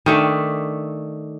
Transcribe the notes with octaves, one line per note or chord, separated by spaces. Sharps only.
D#3 A3 D4